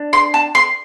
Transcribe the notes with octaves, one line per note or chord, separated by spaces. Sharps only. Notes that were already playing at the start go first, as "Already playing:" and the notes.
Already playing: D4
C6
A5
C6